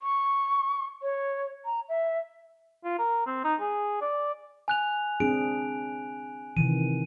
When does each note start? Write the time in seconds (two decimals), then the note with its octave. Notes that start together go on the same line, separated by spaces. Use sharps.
0.01 C#6
1.02 C#5
1.65 A#5
1.89 E5
2.84 F4
2.99 A#4
3.26 C4
3.44 D#4
3.60 G#4
4.01 D5
4.68 G#5 F#6 F7
5.20 C4 D4 G#4 D7
6.57 C3 D#3 E3 D#7